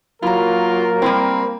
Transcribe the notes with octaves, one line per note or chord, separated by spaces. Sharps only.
F#3 A#3 E4 F4 A#4 A#5
G3 G#3 C4 E4